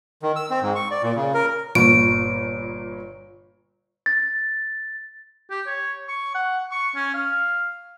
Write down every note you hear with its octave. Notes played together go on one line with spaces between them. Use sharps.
D#3
E6
C4
G#2
C#6
D5
A#2
C#3
A#4
G1 A#2 C#6 D7
A6
G4
C#5
C#6
F#5
C#6
C#4
F5